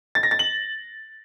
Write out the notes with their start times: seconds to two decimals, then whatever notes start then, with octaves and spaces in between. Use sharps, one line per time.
0.15 A6
0.23 A#6
0.31 A6
0.39 F#7